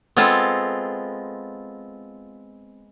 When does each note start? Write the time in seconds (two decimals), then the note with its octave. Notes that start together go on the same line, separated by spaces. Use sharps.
0.17 G#3 B3 C4 F4 A4